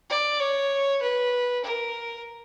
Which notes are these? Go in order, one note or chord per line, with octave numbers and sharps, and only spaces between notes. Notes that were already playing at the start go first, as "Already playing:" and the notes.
D5
C#5
B4
A#4